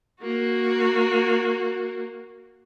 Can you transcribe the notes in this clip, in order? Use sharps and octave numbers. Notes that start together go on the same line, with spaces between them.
A#3 F#4